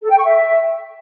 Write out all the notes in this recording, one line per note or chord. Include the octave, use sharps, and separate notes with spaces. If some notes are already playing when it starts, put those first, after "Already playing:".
A4
G5
C#6
E5